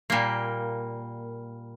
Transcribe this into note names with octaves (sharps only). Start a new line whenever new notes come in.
A#2 G3 A#3